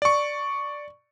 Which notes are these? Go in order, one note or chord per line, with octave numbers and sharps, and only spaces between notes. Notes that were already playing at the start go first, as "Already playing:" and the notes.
D5 C#6